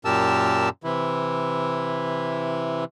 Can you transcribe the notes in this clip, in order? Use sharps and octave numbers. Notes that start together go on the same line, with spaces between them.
F#2 A#2 G4 A#4 A5 E6
C3 E3 E4